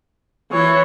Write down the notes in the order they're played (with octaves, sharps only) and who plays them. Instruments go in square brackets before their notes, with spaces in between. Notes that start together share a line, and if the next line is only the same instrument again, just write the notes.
[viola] E3 [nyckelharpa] C#5